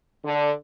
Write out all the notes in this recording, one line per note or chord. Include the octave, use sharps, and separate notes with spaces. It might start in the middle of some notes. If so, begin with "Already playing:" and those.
D3